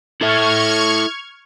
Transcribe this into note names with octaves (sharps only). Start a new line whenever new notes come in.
E4 A4 E5 C#6 F6 G#6